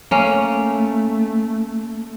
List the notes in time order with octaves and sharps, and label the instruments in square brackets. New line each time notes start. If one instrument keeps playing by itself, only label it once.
[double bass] A3 [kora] A#3 C#4